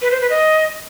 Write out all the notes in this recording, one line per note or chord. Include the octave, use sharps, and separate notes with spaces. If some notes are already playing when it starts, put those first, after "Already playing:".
B4
C5
B4
D#5